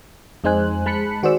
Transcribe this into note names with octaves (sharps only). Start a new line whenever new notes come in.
F2 G#3 D#4 C5 G#5 F#6
G#3 A5 B5 F#6 B6 C#7
D#3 F#4 G#4 C5 D5 E6